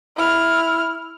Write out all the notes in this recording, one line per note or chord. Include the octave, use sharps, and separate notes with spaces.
E4 F6